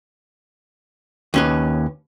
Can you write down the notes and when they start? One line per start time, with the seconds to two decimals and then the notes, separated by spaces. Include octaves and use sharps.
1.34 D#2 C#4 B4